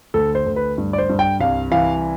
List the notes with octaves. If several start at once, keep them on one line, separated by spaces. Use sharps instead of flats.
D2 A4
C5
D2
B4
G2
D5
C5
G2
G5
C2 F5
E3 F5